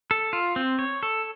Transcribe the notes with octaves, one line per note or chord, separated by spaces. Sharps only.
A4
F4
C4
C#5
A4